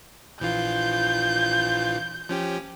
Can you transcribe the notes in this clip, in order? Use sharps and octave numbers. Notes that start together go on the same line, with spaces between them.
A#1 E3 F4 G6
F3 C#4 G4